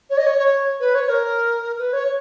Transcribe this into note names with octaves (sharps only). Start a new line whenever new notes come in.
C#5
D#5
C#5
C#5
B4
C#5
A#4
B4
C#5